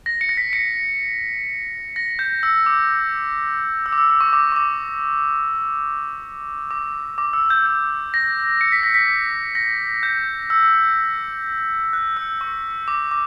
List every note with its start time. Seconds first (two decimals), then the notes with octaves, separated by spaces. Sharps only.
0.06 A#6
0.21 C#7
0.29 A#6
0.37 B6
0.53 C#7
1.96 A#6
2.19 G6
2.43 E6
2.66 D6
3.86 E6
3.93 D6
3.98 E6
4.10 D6
4.21 C#6
4.33 D6
4.52 C#6
4.56 D6
6.71 D6
7.18 D6
7.33 E6
7.50 G6
7.66 G6
8.14 A#6
8.61 C#7
8.72 B6
8.83 A#6
8.94 B6
9.55 A#6
10.03 G6
10.50 E6
11.93 F#6
12.17 E6
12.41 C#6
12.88 D6
13.11 D6